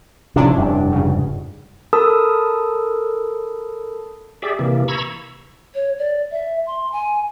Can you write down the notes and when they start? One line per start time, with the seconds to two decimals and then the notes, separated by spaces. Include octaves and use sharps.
0.36 C3 D#3 F3 C#4 D4 E4
0.57 F1 G2
0.91 G#2 C#3
1.93 A4 A#4 A5 B5 D#6 E6
4.42 G4 G#4 D5 E5
4.59 C3 E3 A#3
4.88 A#5 B5 C#6 E6 G#6
5.75 C#5
5.99 D5
6.31 E5
6.67 C6
6.92 G#5